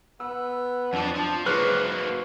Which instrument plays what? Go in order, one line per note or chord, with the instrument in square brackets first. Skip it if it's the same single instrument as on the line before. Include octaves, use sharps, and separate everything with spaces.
[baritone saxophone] B3 [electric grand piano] E6
[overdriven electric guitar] F2 F3 [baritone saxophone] D4
[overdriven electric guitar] F3
[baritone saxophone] G#2 [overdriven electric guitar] F#3 A#3 [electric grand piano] B4 F6 F#6